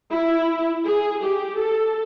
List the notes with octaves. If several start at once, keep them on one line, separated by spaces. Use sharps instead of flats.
E4
G#4
G4
A4